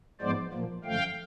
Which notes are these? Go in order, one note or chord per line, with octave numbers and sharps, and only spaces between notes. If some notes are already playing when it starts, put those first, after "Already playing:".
G#2 F3 G#3 B3 C5 D5
A#2 F3 A#3
F#2 D3 F3 A3 F5 G5